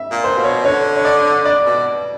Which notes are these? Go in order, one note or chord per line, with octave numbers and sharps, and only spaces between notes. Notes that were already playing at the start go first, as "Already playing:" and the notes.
Already playing: E5
A#2
C5
B2
C#5
D3 C#5
C#5
D5
D5
B2